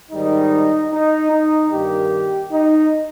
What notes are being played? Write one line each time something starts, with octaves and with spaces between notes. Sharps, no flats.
G#2 D#3 G3 D#4
D#4
D#4
G2 D#3 A#3 G4
D#4